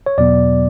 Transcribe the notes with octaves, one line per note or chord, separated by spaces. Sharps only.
C#5
E2 B2 F#3 B3 D5